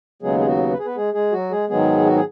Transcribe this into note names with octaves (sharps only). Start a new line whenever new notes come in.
D#2 C#3 F#3 G#3 B3 G#4
G#4
F#3 F#4
B4
G#4
B3 B4
G#3 G#4
G#3 G#4
F#3 F#4
G#3 G#4
G#2 D#3 F#3 G#3 B3 G#4
F#4
G#4